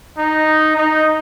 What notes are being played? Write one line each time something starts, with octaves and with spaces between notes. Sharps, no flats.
D#4
D#4